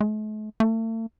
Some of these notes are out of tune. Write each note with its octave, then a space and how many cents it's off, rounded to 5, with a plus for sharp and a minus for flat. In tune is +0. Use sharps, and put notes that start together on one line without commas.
A3 -45
A3 +40